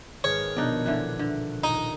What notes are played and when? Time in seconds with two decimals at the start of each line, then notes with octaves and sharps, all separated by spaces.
0.24 G#1 G#4 B4 C#5 F6 C#7
0.57 A#1 B2 B3 D4 D#4 D5 F#6
0.86 D3 E3 D4 F#6
1.19 D3
1.64 D#1 D#4 G#6